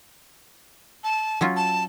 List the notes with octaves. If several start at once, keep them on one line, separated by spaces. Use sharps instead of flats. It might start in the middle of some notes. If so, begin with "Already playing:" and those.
A5
F#3 C#4 F4
A5